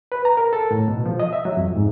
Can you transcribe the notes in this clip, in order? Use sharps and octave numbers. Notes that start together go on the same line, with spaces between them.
B4
A#5
A#4
A4
A2
B2
F3
D#5
E5
F#3
F2
G#2